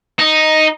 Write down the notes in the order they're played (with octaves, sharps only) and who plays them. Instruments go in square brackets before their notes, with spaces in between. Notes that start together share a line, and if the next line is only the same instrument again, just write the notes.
[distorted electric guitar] D#4